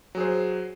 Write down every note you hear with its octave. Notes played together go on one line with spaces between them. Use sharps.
F#3 G#4 C5